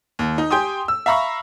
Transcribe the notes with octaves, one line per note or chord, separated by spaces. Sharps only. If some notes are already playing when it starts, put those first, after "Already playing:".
D#2
D#4
G4 G5 G#5 C6 D#6
E6
E5 F5 A#5 B5 C#6